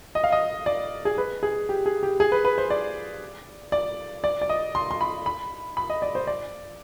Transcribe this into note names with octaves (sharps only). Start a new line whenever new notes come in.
D#5
F5
D#5
D5
G#4
B4
G#4
G4
G#4
G4
G#4
B4
B4
C5
D5
D5
D5
D5
D#5
C6
C6
B5
B5
B5
D#5
D5
C5
D5